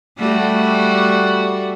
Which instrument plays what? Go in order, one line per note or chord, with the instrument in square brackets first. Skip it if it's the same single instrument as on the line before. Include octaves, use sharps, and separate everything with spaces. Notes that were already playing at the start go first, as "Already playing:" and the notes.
[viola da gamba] G3 A3 F#4